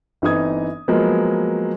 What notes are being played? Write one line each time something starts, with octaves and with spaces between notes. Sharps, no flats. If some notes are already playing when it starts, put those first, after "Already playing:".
G1 E3 C4 D#4 D#6 G#6
F3 F#3 G#3 A#3 B3